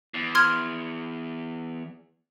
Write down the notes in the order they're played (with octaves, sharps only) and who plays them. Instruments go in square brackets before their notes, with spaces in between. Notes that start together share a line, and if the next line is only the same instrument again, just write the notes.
[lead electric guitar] E2
[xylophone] C6 F6 G#6